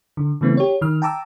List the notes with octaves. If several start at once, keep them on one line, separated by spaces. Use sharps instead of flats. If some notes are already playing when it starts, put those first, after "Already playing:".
D3
C#3 E3 A3 B3 C4
G4 C#5
D#3 F6
G5 A5 A#5 D6 E6